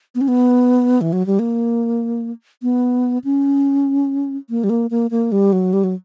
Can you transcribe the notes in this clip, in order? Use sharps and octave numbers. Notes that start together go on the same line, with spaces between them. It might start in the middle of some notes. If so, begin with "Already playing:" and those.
B3
C#4
B3
E3
F#3
G3
A#3
B3
C#4
A#3
G3
A#3
A#3
A#3
G3
F#3
G3
F#3